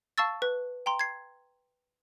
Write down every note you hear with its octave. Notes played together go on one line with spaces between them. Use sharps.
F5 A5 C#6 E6 A6
B4
G5 A#5 C6
G#6 C7